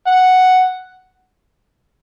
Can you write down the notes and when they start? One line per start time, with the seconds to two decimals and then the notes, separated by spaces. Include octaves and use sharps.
0.07 F#5